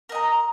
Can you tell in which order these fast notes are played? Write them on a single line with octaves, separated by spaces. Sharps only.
A#4 D#5 A#5